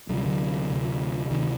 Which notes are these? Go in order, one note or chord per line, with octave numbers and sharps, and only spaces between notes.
D2 C3 F#3
G3
D3 F#3
D2 C3
D2 C3 D#3